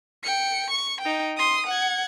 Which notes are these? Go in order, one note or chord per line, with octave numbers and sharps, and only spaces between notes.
G5 C#7
C#6
D#4 G5
C6 D#6
F#5 G#6